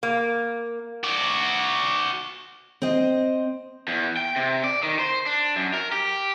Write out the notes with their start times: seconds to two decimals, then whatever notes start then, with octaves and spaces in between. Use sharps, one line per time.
0.03 A#3
1.04 F#4 D5
2.82 C4 C5 D#5
3.88 E2
4.17 G5
4.36 C3
4.64 D5
4.83 D#3
4.99 C5
5.26 D4
5.56 F#2
5.74 A#4
5.92 G4